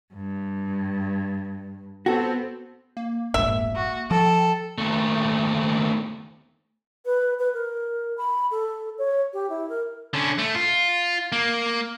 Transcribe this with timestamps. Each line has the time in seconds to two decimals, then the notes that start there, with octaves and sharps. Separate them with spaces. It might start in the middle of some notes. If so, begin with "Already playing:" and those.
0.13 G2
2.06 B3 C4 F#4 A4
2.97 A#3
3.34 F1 A#1 G#2 E5
3.76 F#4
4.11 F3 A4 G5
4.78 D#2 A3
7.06 B4
7.39 B4
7.54 A#4
8.18 B5
8.51 A4
8.99 C#5
9.33 G4
9.50 E4
9.69 A#4
10.14 D3 C#4
10.38 A3
10.55 F4
11.32 A#3